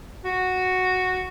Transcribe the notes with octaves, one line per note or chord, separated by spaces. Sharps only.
F#4